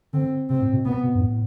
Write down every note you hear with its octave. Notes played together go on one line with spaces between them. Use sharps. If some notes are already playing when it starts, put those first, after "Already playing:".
D3 C4
C3 C4
A2
B2
B2 B3
B2
G2
A2